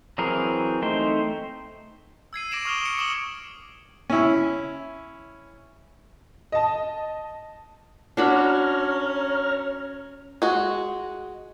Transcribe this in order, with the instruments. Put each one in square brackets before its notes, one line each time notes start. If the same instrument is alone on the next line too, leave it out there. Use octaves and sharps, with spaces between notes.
[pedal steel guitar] E3 F#3 C4 G#4 A#4
A3 C4 D#4 C5 G5
[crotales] E6 G#6 C7 D#7
D6 A#6 D7 E7 F#7
C#6 D#6 F6 F7 G7
C#7
D6 D#6 D7 E7 F#7 G7
[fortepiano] C#4 E4
[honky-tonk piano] D#5 A5
[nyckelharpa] C#4 [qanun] D4 F#4 B5 [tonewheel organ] C#5 A#5 F6
[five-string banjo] G#3 F#4